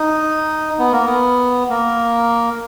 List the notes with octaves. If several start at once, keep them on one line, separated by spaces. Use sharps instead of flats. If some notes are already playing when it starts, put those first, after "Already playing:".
Already playing: D#4
B3
A#3
B3
A#3